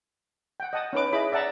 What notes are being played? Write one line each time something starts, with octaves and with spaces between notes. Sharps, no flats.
F#5 G5
D#5 F#5 A5 D#6
C#4 D#4 B4 D6
E4 G#4 D#5 B5 D6
D5 E5 F#5 A5 A#5